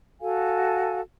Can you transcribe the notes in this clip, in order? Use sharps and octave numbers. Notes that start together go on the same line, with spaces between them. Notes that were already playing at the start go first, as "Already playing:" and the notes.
F#4 A4 F5 G#5